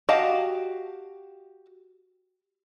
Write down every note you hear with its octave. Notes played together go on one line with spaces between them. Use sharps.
F#4 G4 D#5 F5 A5